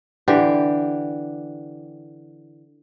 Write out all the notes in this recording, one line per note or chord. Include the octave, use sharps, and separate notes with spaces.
D3 E3 G4